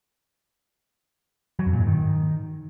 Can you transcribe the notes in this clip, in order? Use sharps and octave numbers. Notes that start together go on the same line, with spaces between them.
F#3
F2
A#2
G#2
D#3